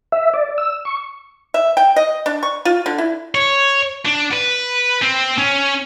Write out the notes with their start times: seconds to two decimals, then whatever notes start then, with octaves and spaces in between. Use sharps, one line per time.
0.12 E5
0.34 D5
0.58 E6
0.85 C#6
1.54 E5
1.77 G5
1.96 D#5
2.26 D4
2.43 C#6
2.65 F4
2.86 D3
2.98 E4
3.35 C#5
4.06 D4
4.33 B4
5.02 C4
5.38 C#4